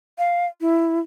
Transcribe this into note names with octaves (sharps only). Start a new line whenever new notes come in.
F5
E4